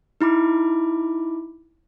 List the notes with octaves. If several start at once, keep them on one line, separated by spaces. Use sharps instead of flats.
D#4 E4 B5 D6